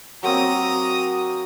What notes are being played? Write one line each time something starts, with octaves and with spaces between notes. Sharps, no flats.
F#3 A#3 C4 A#5 D#6